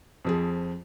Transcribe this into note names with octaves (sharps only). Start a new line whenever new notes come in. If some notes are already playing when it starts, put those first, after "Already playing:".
F2 F3 G#4